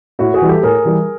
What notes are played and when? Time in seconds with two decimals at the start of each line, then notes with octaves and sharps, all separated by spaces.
0.19 A2 E4 F#4
0.34 F#4 G#4
0.42 E3 G3
0.49 G4 A4
0.63 A2 G#4 A#4
0.85 E3 G3